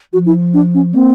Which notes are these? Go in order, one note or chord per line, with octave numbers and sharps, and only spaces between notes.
F3 F#4
E4
D4
C#4
A#3 C4